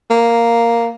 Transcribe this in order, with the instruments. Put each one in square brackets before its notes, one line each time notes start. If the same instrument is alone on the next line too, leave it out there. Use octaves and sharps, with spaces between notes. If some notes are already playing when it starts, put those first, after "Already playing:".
[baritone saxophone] A#3